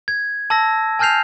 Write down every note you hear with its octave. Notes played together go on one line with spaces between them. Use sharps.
G#6
A5 E6 A#6
G#5 A5 F6 G6 C7 F7